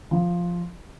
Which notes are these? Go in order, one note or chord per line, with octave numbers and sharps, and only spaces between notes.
F3